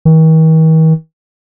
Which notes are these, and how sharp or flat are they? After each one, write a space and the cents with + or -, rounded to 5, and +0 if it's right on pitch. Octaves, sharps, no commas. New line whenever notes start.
D#3 +45